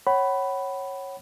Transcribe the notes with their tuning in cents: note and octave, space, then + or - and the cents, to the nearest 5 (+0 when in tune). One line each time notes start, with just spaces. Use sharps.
C#5 -15 F#5 +35 B5 +5